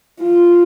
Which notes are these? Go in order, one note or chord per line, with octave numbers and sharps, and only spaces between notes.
F4